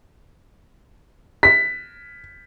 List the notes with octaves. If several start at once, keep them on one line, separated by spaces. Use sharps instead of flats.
B6